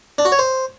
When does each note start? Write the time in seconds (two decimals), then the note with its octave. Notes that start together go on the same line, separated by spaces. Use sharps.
0.18 D4
0.25 F#4
0.32 C#5
0.39 C5